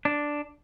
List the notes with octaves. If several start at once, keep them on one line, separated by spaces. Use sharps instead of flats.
D4